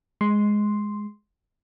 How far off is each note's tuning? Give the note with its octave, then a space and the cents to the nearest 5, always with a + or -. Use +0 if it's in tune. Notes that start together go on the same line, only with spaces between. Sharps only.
G#3 +0 C6 +0